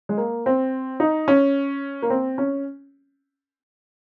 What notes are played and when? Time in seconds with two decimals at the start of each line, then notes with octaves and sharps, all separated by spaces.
0.09 G#3
0.17 A#3
0.46 C4
1.00 D#4
1.28 C#4
2.02 A#3
2.10 C4
2.38 C#4